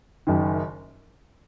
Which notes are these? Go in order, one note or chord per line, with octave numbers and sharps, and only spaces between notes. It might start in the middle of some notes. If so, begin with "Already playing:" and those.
F#1 F#2 D#3